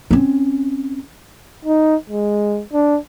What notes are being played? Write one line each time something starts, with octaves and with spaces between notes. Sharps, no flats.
C4 C#4
D#4
G#3
D4